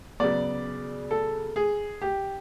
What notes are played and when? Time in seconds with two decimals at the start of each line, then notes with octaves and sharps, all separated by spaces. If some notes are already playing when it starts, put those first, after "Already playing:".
0.20 C#3 F#3 B3 D5
1.11 A4
1.56 G#4
2.02 G4